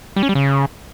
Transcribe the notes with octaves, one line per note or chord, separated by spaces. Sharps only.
G3
C#4
G3
C#3